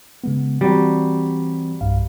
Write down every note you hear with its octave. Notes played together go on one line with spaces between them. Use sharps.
C#3 G#3 B3
E3 F#3 G3 C4
B1 G2 F5